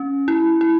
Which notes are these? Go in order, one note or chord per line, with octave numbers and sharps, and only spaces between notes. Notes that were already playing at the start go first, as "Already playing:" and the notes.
Already playing: C#4
E4
E4